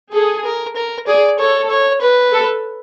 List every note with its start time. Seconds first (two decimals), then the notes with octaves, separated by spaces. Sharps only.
0.13 G#4 A4
0.45 A#4
0.76 A#4
1.07 G#4 D5
1.39 A4 C#5
1.70 C#5
2.02 B4
2.33 A4